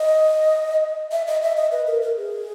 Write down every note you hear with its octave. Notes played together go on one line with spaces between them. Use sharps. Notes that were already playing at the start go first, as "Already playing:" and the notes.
Already playing: D#5
E5
D#5
E5
D#5
B4
A#4
A#4
G#4